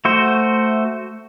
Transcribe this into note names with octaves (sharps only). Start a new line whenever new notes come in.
A3 F#4 C5